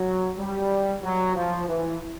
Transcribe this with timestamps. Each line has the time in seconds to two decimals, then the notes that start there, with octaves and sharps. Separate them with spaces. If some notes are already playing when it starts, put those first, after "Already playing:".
Already playing: F#3
0.37 G3
1.02 F#3
1.35 F3
1.68 E3